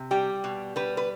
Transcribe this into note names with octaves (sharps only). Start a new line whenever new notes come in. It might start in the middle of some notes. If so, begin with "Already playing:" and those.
Already playing: C3
G3 G4
B2
G3 B4
B4